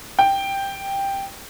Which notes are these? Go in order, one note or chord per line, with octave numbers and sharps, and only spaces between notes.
G5